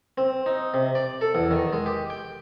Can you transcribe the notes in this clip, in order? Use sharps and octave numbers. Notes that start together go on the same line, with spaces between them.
C4
D#4
C3
D5
A4
E2
D#3
G#3
G4
G5